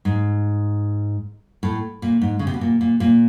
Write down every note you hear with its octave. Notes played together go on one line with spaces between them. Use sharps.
G#2
A2
A#2
G#2
C#3
C3
B2
A#2
A#2
A#2